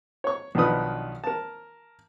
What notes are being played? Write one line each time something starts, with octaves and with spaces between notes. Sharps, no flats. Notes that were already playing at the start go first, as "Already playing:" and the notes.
C#5 C#6
B1 D#3 F3 D4 B4 D#6
A#4 A5